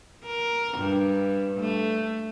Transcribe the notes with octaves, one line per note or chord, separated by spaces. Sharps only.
A#4
G2
A3